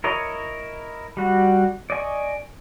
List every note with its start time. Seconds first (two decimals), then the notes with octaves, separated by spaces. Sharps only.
0.04 E4 A#4 C#5 D#5
1.17 G3 F#4
1.90 D5 D#5 G#5 C#6